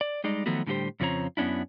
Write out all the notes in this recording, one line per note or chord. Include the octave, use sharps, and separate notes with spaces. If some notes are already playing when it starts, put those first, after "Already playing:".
D5
G3 G#3 D#4 D5
D#3 F3 F#3 A3 B3 F#4
A2 D3 G3 A3 G4 C5
F2 C#3 F3 C4 C#5 A#5
F#2 B3 C#4 D4 E4